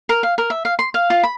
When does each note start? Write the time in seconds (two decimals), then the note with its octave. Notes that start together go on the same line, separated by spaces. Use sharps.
0.09 A#4
0.23 F5
0.38 A#4
0.50 E5
0.65 F5
0.79 C6
0.94 F5
1.10 F4
1.23 B5